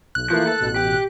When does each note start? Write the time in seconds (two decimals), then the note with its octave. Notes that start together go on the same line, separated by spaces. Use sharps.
0.15 B1 F#6
0.30 E3 F3 A3 A#3
0.47 A4
0.60 A1 B2
0.76 G4